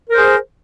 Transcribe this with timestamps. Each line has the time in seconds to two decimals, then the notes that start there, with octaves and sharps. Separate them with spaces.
0.10 A#4
0.14 C5
0.18 G#4